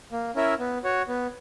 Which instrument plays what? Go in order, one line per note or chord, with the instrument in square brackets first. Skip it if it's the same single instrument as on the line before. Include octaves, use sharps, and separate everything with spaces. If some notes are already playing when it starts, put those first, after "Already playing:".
[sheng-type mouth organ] A#3
C#4 E4 A#4 E5
B3
F#4 C#5
B3